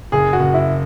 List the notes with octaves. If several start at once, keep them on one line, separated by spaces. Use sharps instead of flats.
F#1 G#4
F#4
F#1
E4